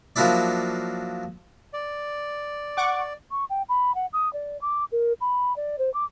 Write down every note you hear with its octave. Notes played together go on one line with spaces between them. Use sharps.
F3 F#3 A#3 D4 E4 D5
D5
F#5 C#6 D6
C#6
G5
B5
F#5
D#6
D5
D6
A#4
B5
D5
C5
D6